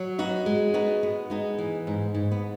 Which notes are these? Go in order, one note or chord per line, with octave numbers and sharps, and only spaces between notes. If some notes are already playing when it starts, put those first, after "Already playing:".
Already playing: F#3
B3 D#4 F#4
G#3
B3 D#4 F#4
B3
G#3 B3 D#4
E3
G#2
G#2
B3